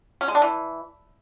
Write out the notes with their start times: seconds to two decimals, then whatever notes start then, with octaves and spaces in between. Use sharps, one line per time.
0.21 C#4
0.28 G#3
0.35 D4
0.42 E3